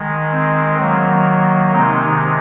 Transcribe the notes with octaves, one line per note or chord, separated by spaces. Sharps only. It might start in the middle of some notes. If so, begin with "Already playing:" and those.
Already playing: D#3 G#3
C4
D#3 F#3 A#3
C3 D#3 G#3 C4 D#4